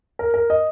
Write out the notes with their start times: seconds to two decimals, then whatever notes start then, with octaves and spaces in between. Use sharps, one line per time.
0.19 A#4
0.34 A#4
0.50 D#5